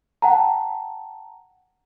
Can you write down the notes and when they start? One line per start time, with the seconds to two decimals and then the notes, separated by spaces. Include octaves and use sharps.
0.22 F#5 G5 A5 A#5